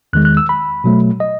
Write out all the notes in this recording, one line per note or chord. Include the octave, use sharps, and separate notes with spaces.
E2 D#3 G#3 F#6
F#6
E6
B5
B2 F#3 A3
D#5